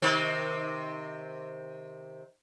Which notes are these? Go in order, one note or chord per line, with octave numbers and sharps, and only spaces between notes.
C3 D#3 C4